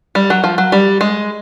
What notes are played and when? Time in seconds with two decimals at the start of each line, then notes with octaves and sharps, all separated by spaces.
0.15 G3
0.30 F#3
0.44 F3
0.58 F#3
0.72 G3
1.01 G#3